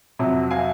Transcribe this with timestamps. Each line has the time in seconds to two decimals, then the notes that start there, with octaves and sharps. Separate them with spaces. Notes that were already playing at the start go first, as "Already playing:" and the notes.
0.19 F2 C3 F#3
0.51 F5 G#5